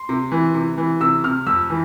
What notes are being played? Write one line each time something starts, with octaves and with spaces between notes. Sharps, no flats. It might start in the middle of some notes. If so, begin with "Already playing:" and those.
Already playing: C6
C3
E3
C3
E3
C3 E6
C3 F6
F2 E6
E3